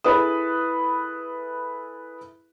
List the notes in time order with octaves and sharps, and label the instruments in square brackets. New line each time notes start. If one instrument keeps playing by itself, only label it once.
[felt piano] E4 G#4 A4 B4 E5 D#6